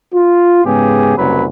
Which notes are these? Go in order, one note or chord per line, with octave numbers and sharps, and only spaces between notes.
F4
G#2 C#3 B3 G4 G#4
F#1 C2 F#2 F#3 B4